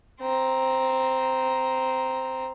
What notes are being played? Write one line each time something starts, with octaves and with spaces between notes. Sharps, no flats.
C4 A#5